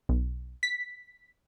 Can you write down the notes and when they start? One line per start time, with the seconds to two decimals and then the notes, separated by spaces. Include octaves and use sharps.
0.09 B1
0.63 B6